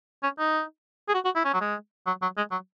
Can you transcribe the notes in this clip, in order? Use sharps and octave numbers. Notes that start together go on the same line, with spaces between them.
C#4
D#4
G#4
F#4
F#4
E4
C#4
F#3
G#3
F#3
F#3
G#3
F#3